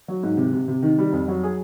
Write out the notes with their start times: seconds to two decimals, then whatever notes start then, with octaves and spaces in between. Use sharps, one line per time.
0.08 F#3
0.23 G#2
0.37 C3
0.53 C3
0.68 C3
0.83 D#3
0.98 G3
1.13 F2
1.28 F#3
1.43 G#4